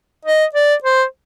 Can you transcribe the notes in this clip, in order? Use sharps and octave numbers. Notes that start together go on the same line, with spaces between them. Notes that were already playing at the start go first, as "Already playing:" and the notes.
D#5
D5
C5